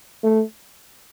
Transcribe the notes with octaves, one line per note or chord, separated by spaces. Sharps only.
A3